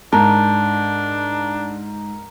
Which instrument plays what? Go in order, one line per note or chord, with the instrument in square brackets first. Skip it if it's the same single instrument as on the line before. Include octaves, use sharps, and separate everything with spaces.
[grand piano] G#2 [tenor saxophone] D4 [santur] A#4 [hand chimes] A5